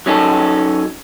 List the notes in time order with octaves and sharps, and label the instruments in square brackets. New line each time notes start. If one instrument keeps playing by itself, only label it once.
[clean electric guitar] F#3 C#4 D#4 A4